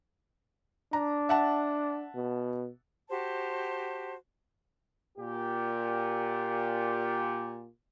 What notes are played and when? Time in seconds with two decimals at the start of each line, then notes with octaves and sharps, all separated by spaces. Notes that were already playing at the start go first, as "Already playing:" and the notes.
0.93 D4 A#5
1.29 E5 F#5 A5
2.15 B2
3.09 F#4 G4 C5 A5
5.18 A#2 G4